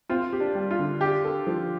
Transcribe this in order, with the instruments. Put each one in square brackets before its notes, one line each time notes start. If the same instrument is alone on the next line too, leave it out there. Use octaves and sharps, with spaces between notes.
[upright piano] C4 [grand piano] F4
[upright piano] G4
[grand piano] D4
[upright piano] G3
[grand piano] F4
[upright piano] D3
[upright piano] D4 [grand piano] G4
[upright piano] A4
F3